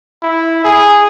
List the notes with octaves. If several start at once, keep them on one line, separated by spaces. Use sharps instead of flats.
E4
G#4